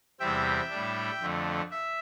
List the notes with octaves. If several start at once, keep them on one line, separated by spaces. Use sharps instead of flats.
E2 C3 G3 C4 E5 G5
A2 G3 D4
F2 D3 A3
E5